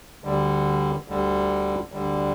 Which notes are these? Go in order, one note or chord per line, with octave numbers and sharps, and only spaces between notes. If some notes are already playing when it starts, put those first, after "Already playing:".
D2 D3 G3
D2 D3 G3
D2 D3 G3